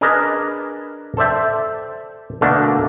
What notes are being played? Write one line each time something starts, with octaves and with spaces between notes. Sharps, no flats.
D4 G#4 A#4 B4 D5 D#5
A4 C5 D5 E5 G5
B2 D3 A3 A#3 D4